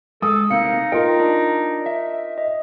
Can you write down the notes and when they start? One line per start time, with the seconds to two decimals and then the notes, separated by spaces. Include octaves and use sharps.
0.22 G#3 A4 D#6
0.50 C3 A#3 D#4 F5 C#7
0.92 F4 A#4 D#5 G5
1.20 D4
1.86 E5
2.38 D#5